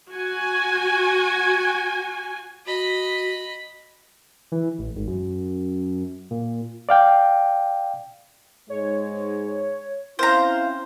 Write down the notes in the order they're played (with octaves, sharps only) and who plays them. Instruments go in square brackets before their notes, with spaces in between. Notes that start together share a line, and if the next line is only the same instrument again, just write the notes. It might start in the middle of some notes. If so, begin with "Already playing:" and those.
[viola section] F#4 G#5
[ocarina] F#4 [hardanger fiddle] D#5 B5
[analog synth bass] E3
A1
G#1
F#2
A#2
[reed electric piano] D5 F5 G5
[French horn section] G#2 G#3 [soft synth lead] C#5
[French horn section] C4 C#4 E4 [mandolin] C5 A#5 [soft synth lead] F5